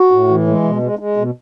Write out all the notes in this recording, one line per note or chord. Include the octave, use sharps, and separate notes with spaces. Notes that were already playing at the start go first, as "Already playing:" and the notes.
Already playing: F#4
A2
E3
G#3
B2
G#3
G#3
B2